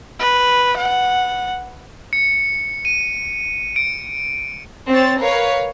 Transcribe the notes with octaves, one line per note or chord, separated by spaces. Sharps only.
B4
F#5
C#7
D#7
D7
C4 C5 C#5 A6
A#4 B4 C#5 F5